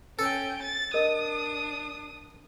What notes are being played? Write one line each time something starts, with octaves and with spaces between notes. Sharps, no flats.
C#4 A4 G5
A6
D4 A#4 D#5 D#6